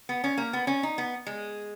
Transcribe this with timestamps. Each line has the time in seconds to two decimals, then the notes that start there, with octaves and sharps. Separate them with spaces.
0.09 B3
0.24 C#4
0.38 A#3
0.53 B3
0.67 C#4
0.83 D#4
0.98 B3
1.27 G#3